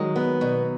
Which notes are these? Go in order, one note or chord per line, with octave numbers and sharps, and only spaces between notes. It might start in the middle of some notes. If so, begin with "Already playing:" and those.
Already playing: D#3 F#3 G#3
B3
B2